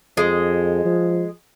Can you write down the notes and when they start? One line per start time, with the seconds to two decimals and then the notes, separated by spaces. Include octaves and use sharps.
0.17 F2 G#3
0.85 F3